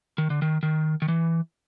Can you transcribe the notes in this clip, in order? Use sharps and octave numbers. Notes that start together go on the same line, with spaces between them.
D#3
D3
D#3
D#3
D#3
E3